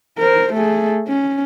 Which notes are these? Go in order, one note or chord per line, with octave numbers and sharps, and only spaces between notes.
A#4 C5
A3 G#4
C#4